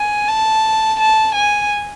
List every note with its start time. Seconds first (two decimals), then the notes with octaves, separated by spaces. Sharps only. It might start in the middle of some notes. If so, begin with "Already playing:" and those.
Already playing: G#5
0.29 A5
1.00 A5
1.35 G#5